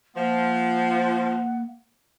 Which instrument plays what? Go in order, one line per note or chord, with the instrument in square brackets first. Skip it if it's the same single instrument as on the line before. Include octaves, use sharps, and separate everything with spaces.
[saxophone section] F3 [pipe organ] A#3 [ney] F#5